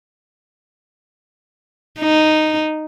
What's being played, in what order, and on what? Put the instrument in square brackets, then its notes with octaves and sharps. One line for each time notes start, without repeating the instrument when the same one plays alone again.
[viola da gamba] D#4